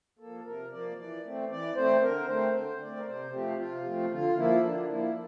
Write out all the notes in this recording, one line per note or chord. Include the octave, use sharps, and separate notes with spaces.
F3 A#3 A4
C3 A#4
F3 A#3 D5
E3 D5
A3 C4
E3 D5
A3 C4 C5
D3 A#4
A3 C4 C5
D3 C5
A3 C4 D5
A#4
C3 C5
F3 A3 C4 G4
C3 F4
F3 A3 C4
D3 F4
F3 A#3 E4
D3 D4
F3 A#3 E4